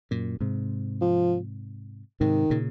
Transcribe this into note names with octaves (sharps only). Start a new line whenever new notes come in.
F#2 A#2
G#2 C3
F3
G#2 C3 D#3
A#2 C#3